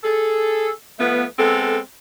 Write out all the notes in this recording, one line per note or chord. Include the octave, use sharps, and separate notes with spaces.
G#4 A4
F3 A3 B3
G#3 B3 C4 A4